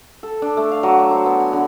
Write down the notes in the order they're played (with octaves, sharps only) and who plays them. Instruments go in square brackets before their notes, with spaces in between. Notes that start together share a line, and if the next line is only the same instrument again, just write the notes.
[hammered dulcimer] A4
D4
A3
F5
F#3
D6
C5
B3
G#5
D3